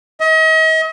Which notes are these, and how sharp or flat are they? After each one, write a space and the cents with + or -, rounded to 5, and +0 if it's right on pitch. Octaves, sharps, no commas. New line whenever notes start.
D#5 +40